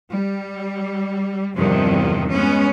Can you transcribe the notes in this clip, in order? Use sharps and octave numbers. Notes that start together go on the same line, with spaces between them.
G3
E2 G2 C3 D#3 F3
G#3 B3 C#4